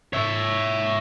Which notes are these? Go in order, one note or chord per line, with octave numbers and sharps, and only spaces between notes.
C#5 E5